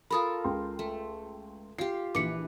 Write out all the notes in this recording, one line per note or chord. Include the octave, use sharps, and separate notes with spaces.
F4 A4 A#4 B5 D#6
C#2 G5 C6
A3
F4 G4 C7
A#1 E3 B4 D6 C#7